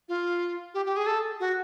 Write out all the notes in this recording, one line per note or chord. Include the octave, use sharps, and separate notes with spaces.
F4
G4
G4
G#4
A4
F#4